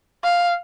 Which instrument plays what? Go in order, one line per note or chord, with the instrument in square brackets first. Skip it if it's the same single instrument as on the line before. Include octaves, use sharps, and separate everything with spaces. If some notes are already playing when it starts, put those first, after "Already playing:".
[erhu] F5